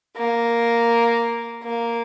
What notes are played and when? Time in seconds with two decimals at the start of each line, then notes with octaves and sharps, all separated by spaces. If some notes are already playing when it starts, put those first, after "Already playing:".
0.17 A#3
1.64 A#3